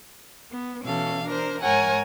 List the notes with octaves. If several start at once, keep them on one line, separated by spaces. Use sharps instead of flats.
B3
B2 E3 C#4 A4 F5
D4 A#4 C5
G#2 A#4 C#5 F#5 G#5